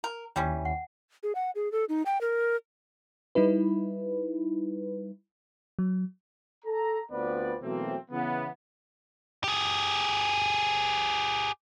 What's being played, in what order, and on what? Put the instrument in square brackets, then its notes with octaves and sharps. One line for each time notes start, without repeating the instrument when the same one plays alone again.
[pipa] A#4
[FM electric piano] D#2 [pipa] E3 G3 C#4 [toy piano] G5
[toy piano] F#5
[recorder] G#4
F#5
G#4
A4
D#4
G5
A#4
[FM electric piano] G3 D#4 E4 B4
F#3
[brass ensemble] A4 A#5
D2 B3 C4 F4 B4 D5
B2 E3 F#3 A3 A#3 C4
C#3 E3 B3
[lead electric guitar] G4 G#4